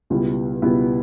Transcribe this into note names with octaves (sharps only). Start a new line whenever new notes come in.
C#2 B2 G3 B3 E4
C#2 B2 G3 B3 E4